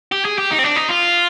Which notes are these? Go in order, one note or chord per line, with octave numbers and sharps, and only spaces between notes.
G4
G#4
G4
D#4
C4
D4
D#4
F4